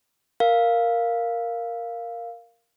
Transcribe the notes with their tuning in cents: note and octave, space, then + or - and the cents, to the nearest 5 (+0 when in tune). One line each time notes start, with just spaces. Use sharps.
A#4 +0 F5 +0